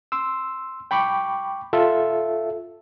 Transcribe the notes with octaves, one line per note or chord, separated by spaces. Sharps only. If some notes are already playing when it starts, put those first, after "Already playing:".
C6 E6
G5 B5 C#6 D6
F4 A4 E5